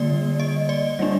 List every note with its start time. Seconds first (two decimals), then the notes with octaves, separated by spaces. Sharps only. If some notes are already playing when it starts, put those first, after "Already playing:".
Already playing: D3 G3 A#3 D5
0.40 D#5
0.69 D5
0.99 G3 A#3 D4